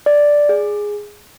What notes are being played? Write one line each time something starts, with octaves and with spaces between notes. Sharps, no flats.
D5
G#4